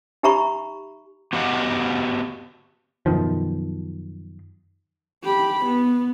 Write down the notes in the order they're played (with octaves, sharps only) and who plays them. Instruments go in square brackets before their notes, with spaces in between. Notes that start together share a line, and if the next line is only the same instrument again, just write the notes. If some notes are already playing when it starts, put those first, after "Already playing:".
[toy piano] D#4 G4 E5 A#5 B5 C#6
[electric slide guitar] B3 F#4 G4 D#5 F5 F#5
[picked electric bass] F#2 B2 D#3 F3
[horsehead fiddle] G4 B5
B3